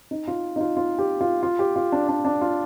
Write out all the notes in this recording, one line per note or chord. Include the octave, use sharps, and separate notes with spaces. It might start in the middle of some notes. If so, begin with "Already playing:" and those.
D#4
F4
D#4
F4
F4
G4
F4
F4
G4
F4
D4
D4
D4
F4